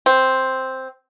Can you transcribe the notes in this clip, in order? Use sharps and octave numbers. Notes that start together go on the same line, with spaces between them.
C4